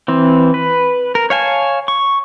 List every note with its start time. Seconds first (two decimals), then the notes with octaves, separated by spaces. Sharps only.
0.08 E3 C4
0.54 B4
1.15 A#4
1.30 C#5 F5 G#5 A5
1.88 C#6